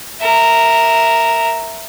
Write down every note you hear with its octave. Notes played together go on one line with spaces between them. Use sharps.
A#4 E5